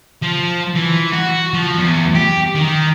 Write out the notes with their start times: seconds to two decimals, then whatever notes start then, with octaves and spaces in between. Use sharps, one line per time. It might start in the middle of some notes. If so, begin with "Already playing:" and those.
0.22 F3
0.75 E3
1.12 F#4
1.53 F3
1.78 E2
2.15 G4
2.55 D#3